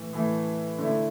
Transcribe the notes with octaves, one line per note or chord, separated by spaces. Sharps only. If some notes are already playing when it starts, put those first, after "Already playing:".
Already playing: A2 E3 A3
A2 E3 A3
D3 A3 E4